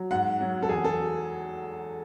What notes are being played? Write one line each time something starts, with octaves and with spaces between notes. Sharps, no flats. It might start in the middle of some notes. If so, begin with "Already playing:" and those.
Already playing: F#3
G#2 F#5
F#3
A4
E2 G#4
A4